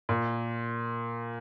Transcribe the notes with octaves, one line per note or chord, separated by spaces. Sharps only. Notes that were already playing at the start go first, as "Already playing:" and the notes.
A#2